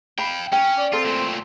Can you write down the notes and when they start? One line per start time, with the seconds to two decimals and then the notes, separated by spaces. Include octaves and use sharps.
0.18 F5 G5 B5
0.52 C#4 G5
0.78 D5
0.93 C4 F4 A4
1.05 A#2 A3